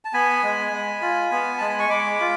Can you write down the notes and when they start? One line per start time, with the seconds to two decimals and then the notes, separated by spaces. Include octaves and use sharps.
0.05 A5
0.13 B3 G#5 B5
0.43 G#3
0.72 G#3
1.01 F4
1.32 B3
1.58 G#3 A5
1.69 B5
1.79 C#6
1.90 G#3 B5 D6
2.20 F4